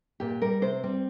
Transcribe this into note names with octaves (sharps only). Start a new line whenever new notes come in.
A#2 G4
G3 A#4
C3 C5
G3 C4